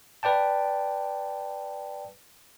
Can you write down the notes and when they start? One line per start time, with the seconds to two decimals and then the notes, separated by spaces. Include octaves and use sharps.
0.23 B4 D5 G5 A5